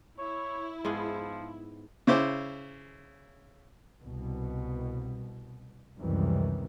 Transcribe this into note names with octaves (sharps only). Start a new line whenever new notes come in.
E4 C#5
G#2 F3 B3 G#4
C#3 E4 C5 D6
C2 B2
C#2 F#2 C3 D#3 E3 G3